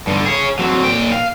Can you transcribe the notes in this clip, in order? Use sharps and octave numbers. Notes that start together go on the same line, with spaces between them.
G2 D3
G#4 C#5
F#3 C4
A#2 G5
F5